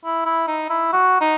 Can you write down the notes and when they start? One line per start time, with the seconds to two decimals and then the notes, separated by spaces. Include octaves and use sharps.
0.05 E4
0.26 E4
0.48 D#4
0.70 E4
0.93 F#4
1.21 D#4